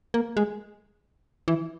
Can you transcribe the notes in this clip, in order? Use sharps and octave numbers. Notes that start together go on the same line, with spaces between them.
A#3
G#3
E3